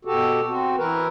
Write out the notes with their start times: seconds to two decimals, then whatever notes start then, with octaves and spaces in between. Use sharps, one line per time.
0.05 B2 F#4 G4 A4
0.48 C4 F#4
0.78 E3 A#4 B4